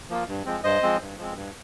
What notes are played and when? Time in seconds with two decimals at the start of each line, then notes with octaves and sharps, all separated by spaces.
0.09 F3 A#3 F4
0.28 G2
0.46 F3 G#3 C4
0.63 G2 C5 D#5
0.83 F3 G#3 C4
1.01 G2
1.18 F3 G#3 C4
1.36 G2